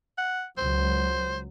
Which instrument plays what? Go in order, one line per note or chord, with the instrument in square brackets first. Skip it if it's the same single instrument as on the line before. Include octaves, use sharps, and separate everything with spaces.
[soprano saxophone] F#5
[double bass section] C#2 F#3 [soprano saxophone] C5